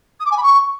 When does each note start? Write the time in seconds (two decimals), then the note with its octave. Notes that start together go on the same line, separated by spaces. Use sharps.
0.20 D#6
0.25 D6
0.31 G#5
0.37 B5
0.43 C#6